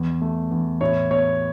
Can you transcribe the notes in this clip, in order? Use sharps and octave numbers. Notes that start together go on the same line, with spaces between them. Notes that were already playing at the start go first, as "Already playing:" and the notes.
Already playing: E2
A3
E2
A2 C#5
B3 C#5